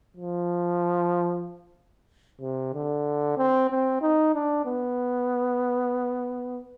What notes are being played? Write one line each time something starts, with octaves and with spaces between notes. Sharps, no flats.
F3
C3
D3
C4
C4
D#4
D4
B3